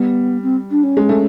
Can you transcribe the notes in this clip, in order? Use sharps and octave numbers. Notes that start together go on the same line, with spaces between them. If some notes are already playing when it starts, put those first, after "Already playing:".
Already playing: G3 B3
C4
D4
C#4
G#3
A3